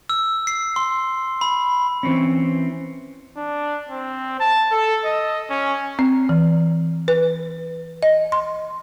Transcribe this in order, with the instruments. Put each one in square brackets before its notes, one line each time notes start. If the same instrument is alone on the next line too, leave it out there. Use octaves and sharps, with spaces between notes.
[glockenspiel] E6
C7
C6
B5
[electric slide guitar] E3 C4 C#4
[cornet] D4
C4
A5
A4
D#5
C#4
[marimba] C4
E3
B4
D#5
C6